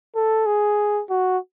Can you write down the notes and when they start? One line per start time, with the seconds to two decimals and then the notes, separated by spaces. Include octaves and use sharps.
0.16 A4
0.46 G#4
1.10 F#4